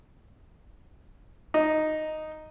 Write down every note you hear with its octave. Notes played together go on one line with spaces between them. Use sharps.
D#4